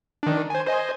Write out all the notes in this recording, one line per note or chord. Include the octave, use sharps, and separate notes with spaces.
D#3 D4
C5 G#5
C5 D#5 G#5